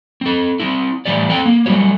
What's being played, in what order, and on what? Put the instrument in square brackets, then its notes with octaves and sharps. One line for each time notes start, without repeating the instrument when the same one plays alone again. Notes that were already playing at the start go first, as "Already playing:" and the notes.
[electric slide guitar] C4 A4
C4 E4
A2 E3 G3 D5
C4 A4 G5
A#3
F#3 G3 A3 F#4 C#5